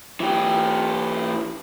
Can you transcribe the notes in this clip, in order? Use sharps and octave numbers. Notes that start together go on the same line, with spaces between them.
E3 G4